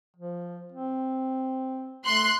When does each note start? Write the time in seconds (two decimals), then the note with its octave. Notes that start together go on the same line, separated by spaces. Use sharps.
0.17 F3
0.72 C4
2.05 A3 C6 F#6